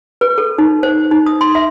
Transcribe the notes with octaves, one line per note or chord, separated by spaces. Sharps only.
B4
A4
D#4
C5
D#4
D#6
C6
E5